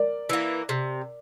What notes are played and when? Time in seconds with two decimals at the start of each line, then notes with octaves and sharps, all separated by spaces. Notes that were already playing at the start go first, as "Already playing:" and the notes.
Already playing: A#4 D5
0.29 E3 A#3
0.69 C3